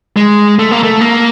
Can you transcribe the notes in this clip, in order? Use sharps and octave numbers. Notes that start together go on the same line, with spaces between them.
G#3
A3
A#3
A3
A#3